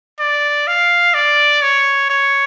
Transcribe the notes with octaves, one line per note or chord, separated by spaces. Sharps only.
D5
F5
D5
C#5
C#5